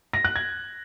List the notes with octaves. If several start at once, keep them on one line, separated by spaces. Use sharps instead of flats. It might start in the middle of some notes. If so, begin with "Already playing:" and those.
A#6
F#6
G#6